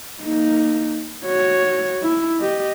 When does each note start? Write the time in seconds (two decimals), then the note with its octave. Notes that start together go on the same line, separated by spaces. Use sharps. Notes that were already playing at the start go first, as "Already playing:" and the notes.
0.22 A#3 D#4
1.25 F#4 C#5
2.02 E4
2.40 G4 D#5